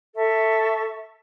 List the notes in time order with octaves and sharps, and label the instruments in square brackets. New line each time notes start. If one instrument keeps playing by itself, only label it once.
[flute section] A4 E5 C#6